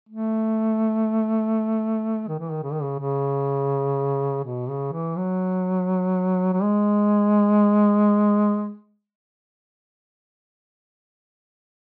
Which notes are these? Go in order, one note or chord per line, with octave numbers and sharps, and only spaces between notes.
A3
D#3
E3
D#3
C#3
D#3
C#3
C#3
B2
C#3
E3
F#3
F#3
G#3